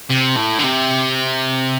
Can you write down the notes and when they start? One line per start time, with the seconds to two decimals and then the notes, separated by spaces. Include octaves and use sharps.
0.10 C3
0.37 A2
0.59 D3
0.64 C3